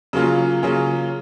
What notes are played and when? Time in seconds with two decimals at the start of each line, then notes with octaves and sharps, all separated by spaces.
0.13 C#3 F#3 A#3 C#4 F4
0.62 C#3 F#3 A#3 C#4 F4